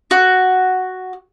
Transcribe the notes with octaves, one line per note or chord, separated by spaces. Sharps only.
F#4